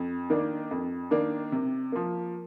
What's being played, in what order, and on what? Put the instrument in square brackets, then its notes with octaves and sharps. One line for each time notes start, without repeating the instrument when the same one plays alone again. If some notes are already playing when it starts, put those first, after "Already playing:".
Already playing: [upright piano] F2
D#3 A#3 D4
F2
D#3 A#3 D4
C3
F3 A#3